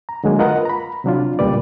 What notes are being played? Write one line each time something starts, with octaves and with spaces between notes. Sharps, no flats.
A#5
D3 F#3 G#3 A#3
F4 A#4 B4 D#5 F#5 A#5
A#5 B5
C3 F#3 D4 F4
C#2 A#2 G3 B4 D5